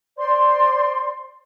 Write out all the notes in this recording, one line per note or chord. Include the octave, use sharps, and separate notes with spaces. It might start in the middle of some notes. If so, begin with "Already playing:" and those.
C5 D5 C6